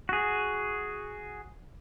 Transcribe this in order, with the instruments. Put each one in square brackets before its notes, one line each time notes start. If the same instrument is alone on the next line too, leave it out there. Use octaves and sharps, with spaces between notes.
[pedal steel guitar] F#4 G#4